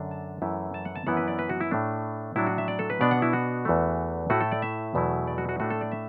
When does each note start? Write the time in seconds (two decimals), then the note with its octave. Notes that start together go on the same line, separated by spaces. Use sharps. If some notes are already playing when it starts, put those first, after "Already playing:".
Already playing: F#2 D3 A3 D4
0.11 A5
0.42 F#2 E3 A3 E4
0.74 A5
0.85 F#5
0.96 A5
1.07 F#2 E3 B3 E4 F#5
1.17 B4
1.28 D5
1.39 B4
1.49 F#4
1.61 E4
1.71 A2 A3 D4
2.36 A2 F#3 D4 E4
2.47 F#4
2.58 E5
2.68 D5
2.79 A4
2.90 B4
3.01 B2 B3 D4 D5
3.11 F#5
3.22 E4
3.33 F#4
3.65 E2 E3 A3
4.30 A2 A3 E4 F#4
4.41 A4
4.52 D5
4.62 E5
4.95 E2 B2 F#3 A3 E4
5.27 D5
5.38 F#4
5.49 F#4
5.60 A2 A3 D4 F#4
5.70 A4
5.81 D5
5.92 E5